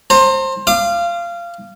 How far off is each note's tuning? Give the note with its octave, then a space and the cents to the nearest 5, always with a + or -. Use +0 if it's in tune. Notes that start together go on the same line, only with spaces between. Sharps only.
C5 +20 A#5 -35
F5 -20 D6 +35